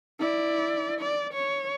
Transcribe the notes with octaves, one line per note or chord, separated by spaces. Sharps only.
E4 D5
D5
C#5